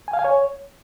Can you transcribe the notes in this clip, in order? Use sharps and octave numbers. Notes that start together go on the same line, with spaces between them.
G#5
F5
G#5
C#5